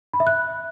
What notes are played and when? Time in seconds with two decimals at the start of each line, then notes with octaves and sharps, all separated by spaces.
0.14 B5
0.20 E5
0.27 F#6